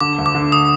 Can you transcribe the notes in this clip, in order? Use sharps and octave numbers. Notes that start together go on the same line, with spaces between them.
D3 D6
D2
D6
D3
D#6